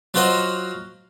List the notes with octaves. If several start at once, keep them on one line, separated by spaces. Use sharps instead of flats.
F#3 F4 F#4 C5 D#5